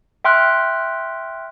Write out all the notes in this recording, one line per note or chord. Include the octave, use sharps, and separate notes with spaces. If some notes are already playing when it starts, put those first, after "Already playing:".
E5 G5 C6 F6 F#6